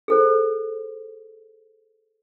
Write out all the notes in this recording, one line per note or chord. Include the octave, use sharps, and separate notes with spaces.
G#4 A4 C5